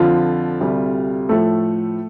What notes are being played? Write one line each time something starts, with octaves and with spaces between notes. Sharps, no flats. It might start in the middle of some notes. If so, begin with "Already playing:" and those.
Already playing: F2 D3 F3 F4
D2 C3 G3
A2 F3 A3 A4